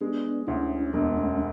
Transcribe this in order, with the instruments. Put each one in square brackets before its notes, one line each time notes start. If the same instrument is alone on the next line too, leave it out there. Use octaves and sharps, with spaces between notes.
[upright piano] G#3 [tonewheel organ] B3 D4
[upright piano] D2 [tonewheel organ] C#4 E4
[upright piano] E1 [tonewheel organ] B3 D4
[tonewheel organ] A3 C#4